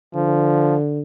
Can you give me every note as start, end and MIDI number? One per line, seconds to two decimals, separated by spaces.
0.15 1.02 50
0.15 0.76 53